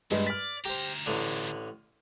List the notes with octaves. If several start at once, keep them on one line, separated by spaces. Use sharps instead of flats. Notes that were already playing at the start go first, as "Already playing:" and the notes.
G2 A#2 G#3
D5 F6 B6
D2 G4 C5 A#5
A1 D3